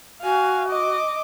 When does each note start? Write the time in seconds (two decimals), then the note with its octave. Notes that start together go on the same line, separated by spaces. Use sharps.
0.23 F#4 F5 G#5
0.68 D#5 D6